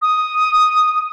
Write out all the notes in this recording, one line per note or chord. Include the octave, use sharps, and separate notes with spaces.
D#6